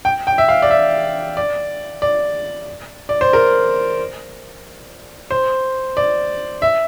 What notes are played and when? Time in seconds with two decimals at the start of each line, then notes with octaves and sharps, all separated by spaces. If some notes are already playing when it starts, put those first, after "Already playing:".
0.05 G5
0.27 G5
0.38 E5
0.49 F5
0.62 D5
0.70 E5
1.37 D5
2.02 D5
3.09 D5
3.21 C5
3.33 A#4
5.31 C5
5.97 D5
6.62 E5